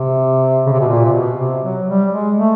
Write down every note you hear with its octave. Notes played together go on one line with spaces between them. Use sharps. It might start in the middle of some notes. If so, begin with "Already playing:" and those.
Already playing: C3
C#3
C3
B2
A#2
C3
B2
C3
F#3
G3
G#3
A3